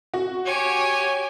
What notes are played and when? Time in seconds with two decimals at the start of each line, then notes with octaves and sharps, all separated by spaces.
0.13 F#4
0.46 G4 C#5 G#5